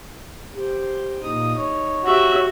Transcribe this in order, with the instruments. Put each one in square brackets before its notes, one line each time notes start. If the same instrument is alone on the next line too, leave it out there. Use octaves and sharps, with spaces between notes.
[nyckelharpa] G4 C5
[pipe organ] A#2 D#6 [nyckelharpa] D#4
[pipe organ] C#5
[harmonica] F#4 [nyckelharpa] G4 E5